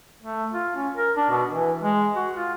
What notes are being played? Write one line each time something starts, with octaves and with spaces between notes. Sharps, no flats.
A3
F4
C#4
A#4
D4
B2
E3
G#3
F#4
F4